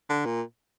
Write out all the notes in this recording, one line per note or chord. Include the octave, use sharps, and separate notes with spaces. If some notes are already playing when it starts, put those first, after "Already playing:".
D3
A#2